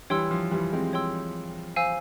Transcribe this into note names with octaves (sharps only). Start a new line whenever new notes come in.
E3 G3 C#5 G5 C6 E6
F3
E3 G3
G#3 C4
C#5 G5 C6 E6
C5 F5 G#5 E6